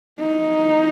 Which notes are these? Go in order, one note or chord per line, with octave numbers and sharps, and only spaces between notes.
D#4